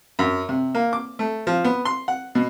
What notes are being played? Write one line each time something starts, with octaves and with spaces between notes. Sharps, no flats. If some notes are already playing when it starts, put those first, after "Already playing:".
F#2
C3
A#3
D6
A3
F3
B3
C6
F#5
B2